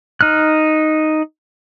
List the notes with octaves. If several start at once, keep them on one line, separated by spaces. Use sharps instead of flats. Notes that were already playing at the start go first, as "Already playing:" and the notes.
D#4 F6 F#6